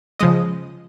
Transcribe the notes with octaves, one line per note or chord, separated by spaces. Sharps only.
C#3 F3 G#3 D#5 D#6